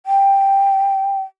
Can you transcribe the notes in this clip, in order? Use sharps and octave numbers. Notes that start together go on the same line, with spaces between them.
G5